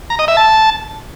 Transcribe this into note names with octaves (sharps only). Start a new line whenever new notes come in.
A#5
D#5
E5
A5